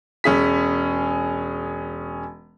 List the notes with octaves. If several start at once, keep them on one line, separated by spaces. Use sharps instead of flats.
E1 C#4 G#4 B6